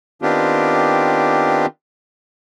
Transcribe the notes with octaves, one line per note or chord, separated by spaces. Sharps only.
D#3 B3 C4 D4 F4 G4